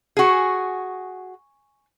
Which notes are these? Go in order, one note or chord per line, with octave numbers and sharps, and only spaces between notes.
F#4 G#4 G#5 C#6